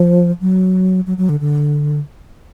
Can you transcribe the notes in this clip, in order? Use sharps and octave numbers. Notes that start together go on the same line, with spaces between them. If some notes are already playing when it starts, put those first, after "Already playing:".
Already playing: F3
F#3
F#3
F#3
D3
D3